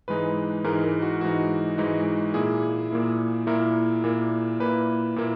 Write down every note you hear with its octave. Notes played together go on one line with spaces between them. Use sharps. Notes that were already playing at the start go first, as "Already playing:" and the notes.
G#2 E3 G#3 D#4 B4
G#2 E3 G#3 D#4 A#4
A#4
F#4
G#2 E3 G#3 D#4 F#4
G#2 E3 G#3 D#4
A#2 A#3 E4 G#4
A#2 A#3 E4
A#2 A#3 E4 A#4
A#2 A#3 E4
A#2 A#3 E4 B4
A#2 A#3 E4